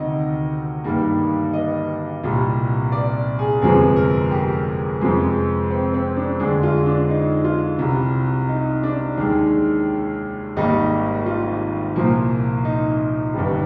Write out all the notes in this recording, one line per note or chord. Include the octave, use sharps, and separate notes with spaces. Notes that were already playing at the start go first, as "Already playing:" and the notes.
Already playing: D2 C3 D#3 D#5
G2 D#3 G3 A#3
D#5
C2 A#2 G3
D5
G#4
G1 F2 C3 F3 G#3 G#4
A#4
G4
F2 C3 F3 G#3
C4
C4
D4
F2 D3 G#3 D4
F4
D4
D#4
F4
C2 C3 G3
D#4
D4
D#2 D#3 G#3 D4
G#1 G#2 G3 A#3 D#4
F4
C2 A#2 F3 A#3
D#4
G1 G2 D#3 G3